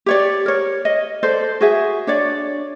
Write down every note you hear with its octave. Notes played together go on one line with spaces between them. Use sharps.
G4 C#5 D5
A#4 C#5
D#5
A4 C5 D5
F#4 G#4 E5
D4 C#5 D5